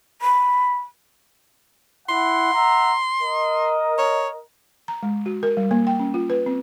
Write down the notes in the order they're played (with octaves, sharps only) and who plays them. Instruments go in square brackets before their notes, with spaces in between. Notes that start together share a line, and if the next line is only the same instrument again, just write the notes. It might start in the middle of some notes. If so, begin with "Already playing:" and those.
[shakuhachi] B5
[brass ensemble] E4 F#5 [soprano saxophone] C6
[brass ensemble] E5 F#5 A#5
A#4 D#5
[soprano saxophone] C#5
[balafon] A#5
G#3
F#4
A#4
G3
A#3
G5
C#4
F4
B4
C4